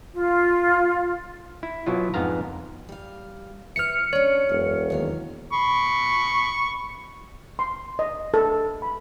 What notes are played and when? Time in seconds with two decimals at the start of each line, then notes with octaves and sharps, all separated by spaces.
0.15 F4
1.63 E4
1.86 B2 F#3 E4 F4
2.14 F2 G#2 B3 F5 A#5
2.89 G3 F5
3.76 E4 B4 C5 F6 C#7
4.13 C#4 D4 C#5
4.49 E1 F#2
4.90 D#2 F#3 F5
5.53 B5 C#6
7.59 C6
7.99 D#5
8.34 A4
8.82 B5